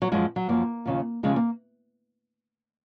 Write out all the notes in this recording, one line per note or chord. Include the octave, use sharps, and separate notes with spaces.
F#3
F#2 F3 G#3
F#3
F#2 F3 A#3
D#2 C#3 F3
D#2 C#3 F3 G#3
A#3